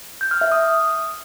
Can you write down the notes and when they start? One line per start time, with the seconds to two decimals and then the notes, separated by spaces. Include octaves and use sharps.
0.21 G6
0.31 F6
0.41 E5
0.52 D#6